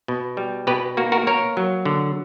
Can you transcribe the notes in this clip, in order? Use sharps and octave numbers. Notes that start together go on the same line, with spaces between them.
B2
G3
B2 G4 B4
A#3 F#4
F#4 A#4
A#3 A#4 C#5
F#3
D3